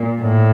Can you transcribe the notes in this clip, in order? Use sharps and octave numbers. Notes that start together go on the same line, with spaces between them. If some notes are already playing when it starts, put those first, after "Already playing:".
Already playing: A#2
A2